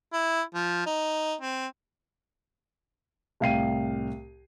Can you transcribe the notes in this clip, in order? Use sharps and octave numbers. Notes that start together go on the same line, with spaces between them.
E4
F3
D#4
C4
C2 A2 F5 G5 C7 D#7